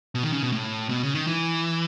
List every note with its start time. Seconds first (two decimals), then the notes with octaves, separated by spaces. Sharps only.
0.15 B2
0.23 D#3
0.33 C#3
0.43 B2
0.52 A2
0.89 B2
1.03 C#3
1.15 D#3
1.27 E3